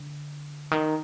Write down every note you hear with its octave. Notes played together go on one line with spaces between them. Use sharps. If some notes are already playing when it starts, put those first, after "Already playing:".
Already playing: D3
D#3